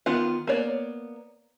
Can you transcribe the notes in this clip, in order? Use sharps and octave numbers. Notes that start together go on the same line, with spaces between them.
D#3 B3 F4 F#5
A#3 B3 C#5 D5